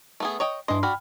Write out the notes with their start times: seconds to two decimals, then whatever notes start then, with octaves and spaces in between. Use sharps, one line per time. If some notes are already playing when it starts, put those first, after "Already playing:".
0.20 A3 B3 G#4
0.40 C#5 D#5 G5
0.68 G2 E3 D4 D#5 C6
0.83 D4 F#4 G5 B5 F6